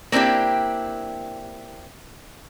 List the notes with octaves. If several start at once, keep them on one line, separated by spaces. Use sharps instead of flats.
A#3 C4 D4 E4 G4